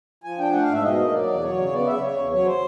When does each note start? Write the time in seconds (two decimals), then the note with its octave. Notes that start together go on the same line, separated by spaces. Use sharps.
0.24 F3 G#5
0.38 D4 G5
0.53 A3 F#5
0.63 F5
0.68 G#2
0.73 E5
0.82 B2 D#5
0.98 A#3
1.12 F#3 D5
1.27 E2
1.42 F#3 C#5
1.57 C#3
1.72 B3 D5
1.87 C#3 E5
2.01 C#3 C#5
2.16 E2
2.31 F#3 C#5
2.46 C5